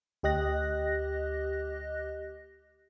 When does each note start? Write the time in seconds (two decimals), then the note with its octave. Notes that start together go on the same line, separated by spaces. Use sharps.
0.23 D2 G4 D#5 F#6 A#6